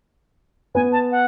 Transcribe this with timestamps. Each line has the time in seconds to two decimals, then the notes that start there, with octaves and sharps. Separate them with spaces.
0.75 B3 G#5
0.92 A5
1.11 F#5